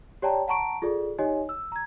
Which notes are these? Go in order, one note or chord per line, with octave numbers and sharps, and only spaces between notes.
G4 C#5 D5 G5 A5 A#5
F#5 A5 A#5 C#6 D7
F4 G#4 A4 D5
D#4 G4 C#5 D#5 G#5
E6
A#5 G#6